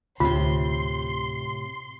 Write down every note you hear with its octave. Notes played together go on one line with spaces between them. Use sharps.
D2 A2 C3 F4 C6